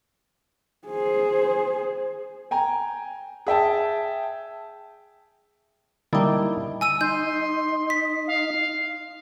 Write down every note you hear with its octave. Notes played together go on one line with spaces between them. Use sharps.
G#4 C5
G5 G#5 A#5
G#4 E5 G5 A5
D3 G3 A#3 D#4 E4
G#5 E6 D#7
D#4 C6 G6
B6
F5